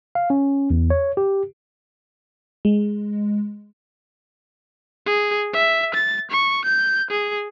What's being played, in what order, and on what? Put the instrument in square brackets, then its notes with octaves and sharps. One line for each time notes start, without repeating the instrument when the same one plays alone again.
[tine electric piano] F5
C#4
E2
C#5
G4
[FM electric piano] G#3
[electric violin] G#4
E5
A6
C#6
G6
G#4